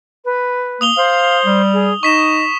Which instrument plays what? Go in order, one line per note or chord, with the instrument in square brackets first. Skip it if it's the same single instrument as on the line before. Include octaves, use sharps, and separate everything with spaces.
[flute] B4
[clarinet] A#3 [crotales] D#6 F7 G7
[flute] C5 [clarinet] F5
[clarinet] G3
[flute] G#4
[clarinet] D#4 [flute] D#5 [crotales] C#6 B6 E7